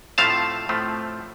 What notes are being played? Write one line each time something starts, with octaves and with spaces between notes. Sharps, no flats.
A2 F3 A3 C4 F5 A5
A2 F3 A3 C4